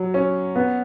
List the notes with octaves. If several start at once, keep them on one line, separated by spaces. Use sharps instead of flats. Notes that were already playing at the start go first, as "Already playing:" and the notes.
Already playing: F#3
C#4
B3